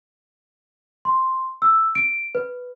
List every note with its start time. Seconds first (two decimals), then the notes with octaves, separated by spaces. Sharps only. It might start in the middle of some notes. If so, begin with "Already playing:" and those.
1.05 C6
1.62 E6
1.95 D7
2.35 B4